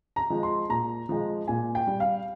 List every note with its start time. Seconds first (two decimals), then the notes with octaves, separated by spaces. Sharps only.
0.16 A#5
0.30 F3 G#3
0.43 C6
0.69 A#2 A#5
1.09 F3 G#3
1.48 A#2 G#5
1.75 G5
1.87 G3
2.00 F5